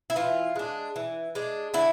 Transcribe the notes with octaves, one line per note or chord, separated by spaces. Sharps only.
E4
E3 F4
G#3 D4
E3
G#3 D4
D3 E4